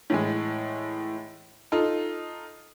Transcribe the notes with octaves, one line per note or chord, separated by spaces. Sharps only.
A2 E3 G#3
D#4 F4 A4